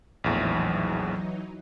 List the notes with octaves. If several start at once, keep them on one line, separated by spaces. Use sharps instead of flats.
A#1 E2 A2 E3 F#3 D#4